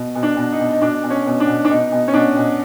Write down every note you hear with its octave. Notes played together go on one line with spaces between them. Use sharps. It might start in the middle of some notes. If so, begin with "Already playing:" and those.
Already playing: B2
B2
D4
B2
D#4
B2
D#4
B2 D4
B2
C#4
B2
D4
B2
D4
B2 D#4
B2
C#4
B2 D4
B2